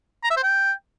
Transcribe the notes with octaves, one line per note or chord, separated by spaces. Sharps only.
A#5
E5
C5
G5